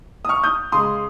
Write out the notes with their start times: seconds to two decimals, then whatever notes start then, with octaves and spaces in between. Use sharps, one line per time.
0.25 D#6
0.29 C#6 F6
0.43 D#6 G6
0.72 C#3 G#3 C6 D#6